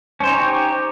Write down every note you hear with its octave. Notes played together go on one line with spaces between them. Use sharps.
C#4 D#4 G4 C5 C#5